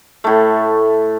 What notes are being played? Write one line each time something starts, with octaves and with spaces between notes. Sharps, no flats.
A2 A3